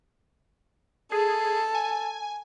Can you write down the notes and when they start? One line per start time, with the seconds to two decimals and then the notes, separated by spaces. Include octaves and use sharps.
1.12 G#4 A4
1.75 G#5